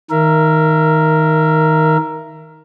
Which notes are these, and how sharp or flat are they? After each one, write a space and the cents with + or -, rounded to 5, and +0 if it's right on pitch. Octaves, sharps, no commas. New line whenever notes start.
D#3 +15 A#4 +0 E5 +30